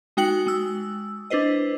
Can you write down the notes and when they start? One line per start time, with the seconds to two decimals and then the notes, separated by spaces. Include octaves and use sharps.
0.17 G#3 D#4 F#4 G5 F#6 F#7
0.47 G#3 E6
1.30 D4 E4 B4 C5 D#5